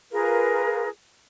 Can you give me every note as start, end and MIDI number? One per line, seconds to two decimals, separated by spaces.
0.11 0.88 65
0.11 0.88 68
0.11 0.88 70
0.11 0.88 71